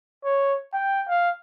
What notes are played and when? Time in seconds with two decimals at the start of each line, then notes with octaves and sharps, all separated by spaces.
0.24 C#5
0.73 G5
1.08 F5